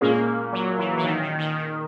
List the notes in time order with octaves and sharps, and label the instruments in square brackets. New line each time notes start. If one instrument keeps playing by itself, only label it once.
[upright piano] A#2 G#3 C#4 G#4 [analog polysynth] A#3
[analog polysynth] F#3
E3
E3
D#3
D#3
D#3
D#3